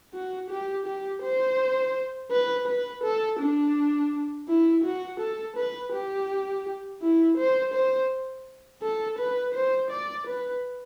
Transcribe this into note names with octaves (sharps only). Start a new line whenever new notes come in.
F#4
G4
G4
C5
B4
B4
A4
D4
E4
F#4
A4
B4
G4
E4
C5
C5
A4
B4
C5
D5
B4